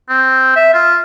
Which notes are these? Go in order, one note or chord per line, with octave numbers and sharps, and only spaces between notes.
C4
E5
F4